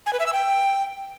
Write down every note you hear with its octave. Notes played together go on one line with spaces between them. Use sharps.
G#5
B4
E5
E6
G5